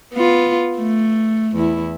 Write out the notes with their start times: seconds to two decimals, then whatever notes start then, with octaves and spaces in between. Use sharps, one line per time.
0.13 B3 F4
0.77 A3
1.56 E2 E4